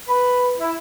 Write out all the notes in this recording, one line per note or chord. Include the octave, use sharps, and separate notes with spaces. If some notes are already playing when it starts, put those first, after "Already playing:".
B4
E4